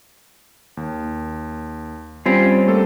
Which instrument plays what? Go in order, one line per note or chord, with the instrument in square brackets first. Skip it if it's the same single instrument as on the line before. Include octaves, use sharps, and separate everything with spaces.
[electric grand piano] D#2
[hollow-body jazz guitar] G3 C4 C#4 [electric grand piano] F4
[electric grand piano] A3 A#3 A4